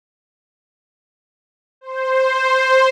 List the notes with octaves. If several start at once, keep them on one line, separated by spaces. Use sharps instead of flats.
C5